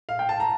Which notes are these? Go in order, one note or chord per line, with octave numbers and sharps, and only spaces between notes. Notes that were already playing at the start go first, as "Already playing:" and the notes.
F5
G5
A5
A#5